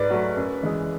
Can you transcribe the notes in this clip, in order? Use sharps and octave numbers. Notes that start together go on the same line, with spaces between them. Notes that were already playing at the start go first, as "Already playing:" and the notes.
Already playing: G#2 B4 D5
F#3 A3
F#2
E3 G#3